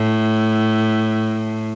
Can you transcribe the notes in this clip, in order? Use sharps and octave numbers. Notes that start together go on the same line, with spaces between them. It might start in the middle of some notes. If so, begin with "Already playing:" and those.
Already playing: A2